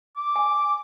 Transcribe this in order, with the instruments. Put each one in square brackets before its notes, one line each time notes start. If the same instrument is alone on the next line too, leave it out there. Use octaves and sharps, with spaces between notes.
[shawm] D6
[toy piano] G#5